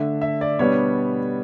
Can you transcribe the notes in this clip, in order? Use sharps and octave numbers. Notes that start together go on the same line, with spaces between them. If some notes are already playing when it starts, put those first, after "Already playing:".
Already playing: D3 A3 D4 E5
E5
D5
B2 G3 B3 D4 C#5